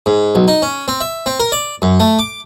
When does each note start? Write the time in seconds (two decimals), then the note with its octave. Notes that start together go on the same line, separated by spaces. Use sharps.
0.06 G#2
0.35 B1
0.48 D#4
0.62 C#4
0.88 C4
1.01 E5
1.26 C4
1.40 A#4
1.52 D5
1.82 F#2
2.00 A3
2.19 D6